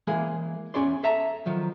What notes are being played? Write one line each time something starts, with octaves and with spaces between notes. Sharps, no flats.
E3 G#3 A#3 G#4
E2 D#3 C#4 G#4 D5 C6
A4 E5 A5 A#5
D#3 F3 F#3